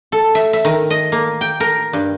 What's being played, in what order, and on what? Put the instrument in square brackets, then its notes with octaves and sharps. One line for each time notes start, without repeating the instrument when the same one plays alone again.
[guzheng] A4
E5
E5
D#3
D#5
A#3
G5
A#4
G2